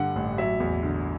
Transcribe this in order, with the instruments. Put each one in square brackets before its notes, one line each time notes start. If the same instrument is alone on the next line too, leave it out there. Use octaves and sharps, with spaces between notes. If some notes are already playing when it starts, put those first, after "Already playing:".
Already playing: [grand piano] G2 D3 G3 F#5
A1
F#3 E5
E2
D3